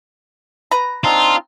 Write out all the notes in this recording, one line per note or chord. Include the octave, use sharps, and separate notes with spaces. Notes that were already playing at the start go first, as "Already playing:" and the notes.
B4 A#5
C4 D4 D#4 F4